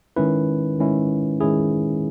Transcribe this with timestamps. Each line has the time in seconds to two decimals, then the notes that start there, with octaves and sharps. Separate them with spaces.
0.16 D#3 G#3 C#4 E4 B4
0.79 D#3 G#3 C#4 E4
1.41 D#3 G#3 C#4 E4 G#4